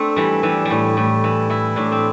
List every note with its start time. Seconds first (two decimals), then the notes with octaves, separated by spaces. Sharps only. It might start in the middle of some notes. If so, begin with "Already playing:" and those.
Already playing: A3 C4 D4
0.16 E3 G3
0.43 E3 G3
0.65 G3
0.70 A2
0.97 A2
1.24 E3
1.50 E3 E4
1.76 A2 D4
1.92 C4